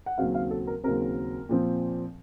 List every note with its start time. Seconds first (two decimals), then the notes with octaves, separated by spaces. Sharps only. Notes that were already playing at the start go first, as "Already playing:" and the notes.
0.06 F#5
0.18 D#2 C#3 F#3 C4 F5
0.35 F5
0.51 A4
0.67 A#4
0.84 D#2 C#3 F#3 C4 A#4
1.49 A#2 F3 C4